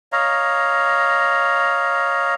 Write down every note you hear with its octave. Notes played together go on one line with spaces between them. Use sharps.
C#5 D#5 F5 A#5